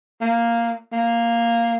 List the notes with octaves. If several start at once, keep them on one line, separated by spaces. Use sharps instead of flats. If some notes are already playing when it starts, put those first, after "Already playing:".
A#3
A#3